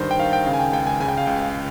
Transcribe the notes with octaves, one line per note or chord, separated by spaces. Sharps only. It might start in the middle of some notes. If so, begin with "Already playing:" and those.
Already playing: G2 D#3 C5
G5
D#3 F5
G5
C#3 F5
G#5
G5
C#2 G5
G#5
C#3 G#5
G5
F5
C#2 G5